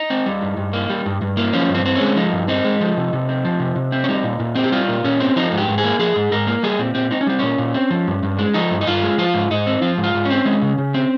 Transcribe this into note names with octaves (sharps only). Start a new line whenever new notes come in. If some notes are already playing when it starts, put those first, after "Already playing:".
Already playing: D#4
C4
G3
G2
G2
A#3
G3
G2
G2
A#3
F3 C#4
G2
C4
C4
G#3 C#4
F3 D#4
G2
C4 D#4
G#3
F3
C3
C3
C4
F3
C3
C3
C4
C#4
G3 D#4
A#2
A#2
C4
G4
G3 F4
A#2
A#2 C#4
C4
F3 D#4
G#2
G4
G#2
G#4
A#3
F3 G#4
G#2
G#2 A#4
A#3
G3 G#4
A#2 C4
A#2 C4
C4 D#4
C#4
G3 C4
A#2 C#4
A#2
C4
F3
G2
G2
G#3
F3 D#4
G2
D#4
G2 F4
G#3
F3 F4
G#2
G#2 D#4
C4
F3 F4
G#2
F4
G#2
C#4
C4
G#3
C#3
C#3
C4